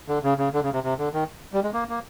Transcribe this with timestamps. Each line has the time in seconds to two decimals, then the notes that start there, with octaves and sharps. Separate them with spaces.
0.08 D3
0.23 C#3
0.38 C#3
0.53 D3
0.63 C#3
0.73 C3
0.84 C3
0.98 D3
1.13 D#3
1.53 G3
1.63 G#3
1.73 A#3
1.89 A#3